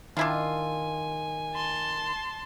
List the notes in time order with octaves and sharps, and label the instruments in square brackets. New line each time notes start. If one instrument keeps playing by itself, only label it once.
[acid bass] D#3 [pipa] D4 E4 F4 [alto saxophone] G#5
[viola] A5 C6